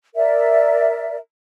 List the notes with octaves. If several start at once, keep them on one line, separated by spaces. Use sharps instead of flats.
A#4 D5 E5